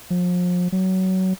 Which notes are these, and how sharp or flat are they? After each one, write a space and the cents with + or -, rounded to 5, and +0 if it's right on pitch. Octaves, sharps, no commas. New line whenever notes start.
F3 +35
F#3 +20